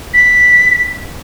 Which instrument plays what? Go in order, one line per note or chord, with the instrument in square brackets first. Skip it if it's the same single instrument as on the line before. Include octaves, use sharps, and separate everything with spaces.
[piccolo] B6